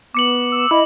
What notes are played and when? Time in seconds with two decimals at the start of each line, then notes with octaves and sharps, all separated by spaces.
0.15 B3 D6 C#7 F#7
0.52 E6
0.71 E4 D#5